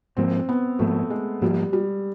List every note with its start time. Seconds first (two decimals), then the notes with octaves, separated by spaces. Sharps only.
0.17 G#2 F3 A#3 C4
0.49 B3
0.79 G#2 F3 A3 A#3
1.10 G#3
1.42 G#2 F3 G3 A#3
1.73 G3